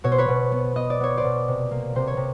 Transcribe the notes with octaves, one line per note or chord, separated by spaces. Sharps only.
B2 C#5
C5
B4 C#5
B2
B3
B3 D#5
D5
B3 C#5
C5 D5
B2
C3
A#3
C3 C5
C#5
C3